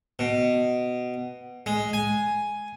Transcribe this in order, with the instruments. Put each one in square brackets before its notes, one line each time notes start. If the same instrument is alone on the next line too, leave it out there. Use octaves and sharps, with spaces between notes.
[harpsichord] B2
G#3
G#5